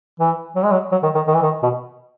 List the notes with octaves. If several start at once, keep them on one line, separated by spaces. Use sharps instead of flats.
E3
F#3
G#3
F#3
F#3
D#3
D#3
D#3
E3
D#3
B2